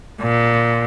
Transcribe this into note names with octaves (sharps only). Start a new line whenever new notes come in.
A#2